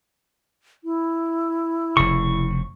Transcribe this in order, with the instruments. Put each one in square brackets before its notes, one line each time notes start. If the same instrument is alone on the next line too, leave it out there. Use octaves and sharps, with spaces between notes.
[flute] E4
[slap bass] F1 C#3 [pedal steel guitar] C#6